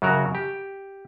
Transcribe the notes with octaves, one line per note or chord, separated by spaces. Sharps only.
F#2 C#3 F#3 F#4 A#4
G4